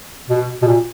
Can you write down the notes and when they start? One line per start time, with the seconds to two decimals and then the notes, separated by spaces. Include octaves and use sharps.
0.29 B2
0.62 B2
0.68 A#2